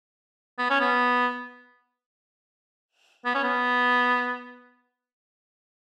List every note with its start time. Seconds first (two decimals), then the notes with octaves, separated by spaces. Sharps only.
0.59 B3
0.70 C#4
0.81 B3
3.26 B3
3.35 C#4
3.44 B3